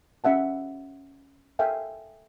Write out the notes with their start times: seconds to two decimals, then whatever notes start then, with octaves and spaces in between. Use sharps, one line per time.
0.24 C#4 E5 F#5 A5
1.59 A4 E5 F5 G5 G#5